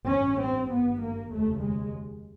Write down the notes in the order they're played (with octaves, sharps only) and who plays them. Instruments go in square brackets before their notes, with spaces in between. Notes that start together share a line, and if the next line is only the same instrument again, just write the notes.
[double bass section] A1 G2 C#4
C4
G#1 G2 B3
A#3
F1 D#2 C#3 A3
G#3